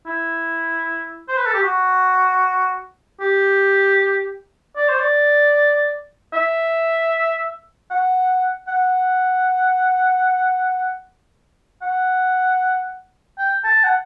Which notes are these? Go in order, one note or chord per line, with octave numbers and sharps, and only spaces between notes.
E4
C5
B4
A4
G4
F#4
G4
D5
C5
D5
E5
F#5
F#5
F#5
G5
A5
F#5